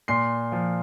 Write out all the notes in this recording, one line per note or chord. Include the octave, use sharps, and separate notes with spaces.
A#2 C6 C7
F3